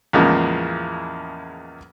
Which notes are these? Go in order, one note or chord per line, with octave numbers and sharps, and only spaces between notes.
E2 A2 C#3 F3 G#3 A#3